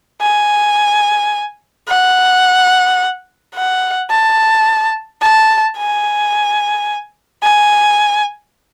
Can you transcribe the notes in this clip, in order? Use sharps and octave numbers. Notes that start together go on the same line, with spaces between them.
G#5
F#5
F#5
A5
A5
G#5
G#5